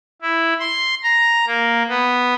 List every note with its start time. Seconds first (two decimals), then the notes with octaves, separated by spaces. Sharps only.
0.22 E4
0.60 C6
1.03 A#5
1.46 A#3
1.88 B3